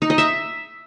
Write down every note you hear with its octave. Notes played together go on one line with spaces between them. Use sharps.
D#4
D#5
E5